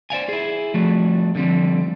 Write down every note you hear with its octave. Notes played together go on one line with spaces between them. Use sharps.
C5 D5 F5 G#5
E4 G#4
F3 G3 A3 F#4
D3 F3 G3 C4